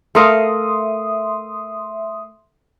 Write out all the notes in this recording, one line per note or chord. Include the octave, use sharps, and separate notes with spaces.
A3 A#4 E5 F5 C6 D#6